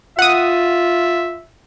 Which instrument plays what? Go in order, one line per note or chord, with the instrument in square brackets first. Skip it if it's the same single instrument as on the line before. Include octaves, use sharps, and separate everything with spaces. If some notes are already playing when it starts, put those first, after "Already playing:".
[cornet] F4 [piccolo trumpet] E5 [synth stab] F#5 D#6